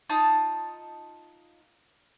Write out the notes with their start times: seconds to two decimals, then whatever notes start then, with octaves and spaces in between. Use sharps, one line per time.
0.09 D#4 F4 A5 D#6